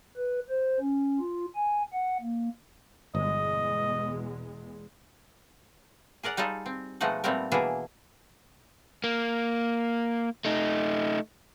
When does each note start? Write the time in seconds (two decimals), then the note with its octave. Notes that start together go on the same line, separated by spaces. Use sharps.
0.16 B4
0.49 C5
0.80 C#4
1.20 F4
1.55 G#5
1.93 F#5
2.21 A#3
3.15 G1 E2 B2 G#3 D#5
6.23 G#4 A#4 D5 F#5
6.37 G3 D#4 F4 G#4 A4
6.66 C4
7.01 B2 F3 G#3 A3 D#4 F#5
7.24 A#2 G3 A3 B3 C4 A#4
7.52 B2 E3 A#3 D4 E4 G#4
9.04 A#3
10.45 A3 D#4